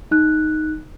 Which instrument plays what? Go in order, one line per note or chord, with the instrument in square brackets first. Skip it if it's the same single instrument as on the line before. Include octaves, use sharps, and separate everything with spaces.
[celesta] D#4 F#6